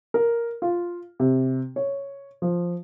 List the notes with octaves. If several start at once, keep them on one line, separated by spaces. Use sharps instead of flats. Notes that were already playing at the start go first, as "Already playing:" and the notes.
A#4
F4
C3
C#5
F3